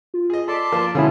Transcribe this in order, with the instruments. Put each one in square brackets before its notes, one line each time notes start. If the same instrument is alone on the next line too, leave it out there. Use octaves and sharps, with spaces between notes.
[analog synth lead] F4
[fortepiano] G#4 D#5
[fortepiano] A4 [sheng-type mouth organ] D5 A5 C6 [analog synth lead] B6
[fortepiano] F3 A#3
[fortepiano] B2 G#3 [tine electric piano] D3 C#4 E4 [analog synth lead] F5